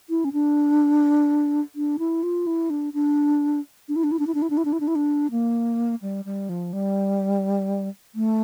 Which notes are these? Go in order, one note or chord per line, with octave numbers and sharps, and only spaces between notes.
E4
C#4
D4
D4
E4
F4
E4
D4
D4
D4
E4
D4
E4
D4
E4
D4
E4
D4
E4
D4
E4
D4
E4
D4
A#3
G3
G3
F3
G3
A3